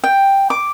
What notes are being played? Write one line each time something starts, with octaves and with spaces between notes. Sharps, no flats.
G5
D6